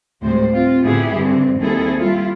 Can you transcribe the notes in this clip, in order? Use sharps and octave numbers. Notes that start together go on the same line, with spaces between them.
D2 A2 C3 G3 G#3 C5
C4 F4
A2 D3 B3 E4 G4 G#4
G2 D3 C4
D#2 G3 C4 E4 G#4 A4
G3 E4 F4